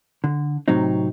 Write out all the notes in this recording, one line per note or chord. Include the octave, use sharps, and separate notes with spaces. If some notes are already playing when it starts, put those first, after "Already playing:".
D3
A2 C3 F#3 C4 D#4